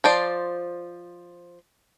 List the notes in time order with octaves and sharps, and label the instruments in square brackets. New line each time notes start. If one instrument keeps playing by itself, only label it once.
[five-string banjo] F3 C5 D5